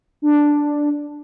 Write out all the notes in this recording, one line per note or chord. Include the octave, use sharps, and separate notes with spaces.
D4